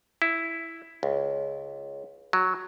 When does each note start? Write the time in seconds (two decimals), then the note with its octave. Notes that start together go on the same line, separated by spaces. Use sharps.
0.22 E4
1.03 C#2
2.33 F#3